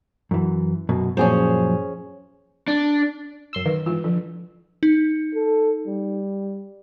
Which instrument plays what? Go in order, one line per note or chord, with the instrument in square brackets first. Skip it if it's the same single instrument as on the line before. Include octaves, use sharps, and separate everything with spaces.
[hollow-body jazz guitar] F#2 E3
F#2 B2
[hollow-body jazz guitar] F#2 A#2 F3 [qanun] C#4 G#4 C5
[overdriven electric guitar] D4
[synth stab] F#2 C6 E6
[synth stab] D#3 [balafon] B4
[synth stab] G#2 E3 [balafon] F4
[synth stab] D3 [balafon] F3
[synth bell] D#4
[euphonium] A4
G3